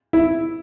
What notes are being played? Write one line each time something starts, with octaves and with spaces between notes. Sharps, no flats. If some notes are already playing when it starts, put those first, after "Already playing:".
E4